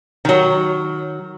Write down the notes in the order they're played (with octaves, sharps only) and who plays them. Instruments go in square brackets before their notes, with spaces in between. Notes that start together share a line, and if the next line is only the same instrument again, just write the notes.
[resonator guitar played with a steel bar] D#3 F#3